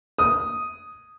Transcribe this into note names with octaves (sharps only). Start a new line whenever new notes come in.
D#6